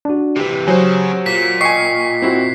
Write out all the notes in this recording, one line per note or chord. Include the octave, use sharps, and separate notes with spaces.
D4 F#4
C3 E3 G4
F#3 C#4 G#4 C5
A#2 B6
D#5 G5 G#5 C#6 C7 C#7
C4 E4 F#4